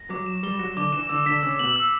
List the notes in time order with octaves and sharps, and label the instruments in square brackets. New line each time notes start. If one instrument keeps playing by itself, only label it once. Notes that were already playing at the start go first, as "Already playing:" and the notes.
Already playing: [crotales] A#6
[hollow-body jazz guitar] F#3 [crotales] D6
[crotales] E7
[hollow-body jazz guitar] G3 [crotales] G7
[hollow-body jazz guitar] F#3 [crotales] A#6
[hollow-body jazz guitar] D3 [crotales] D6
[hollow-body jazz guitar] E3 [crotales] E7
[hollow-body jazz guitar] D3 [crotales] E6
[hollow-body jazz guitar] D3 [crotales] B6
[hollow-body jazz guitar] C#3 [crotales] E6
[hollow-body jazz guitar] B2 [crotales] F#7
[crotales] E6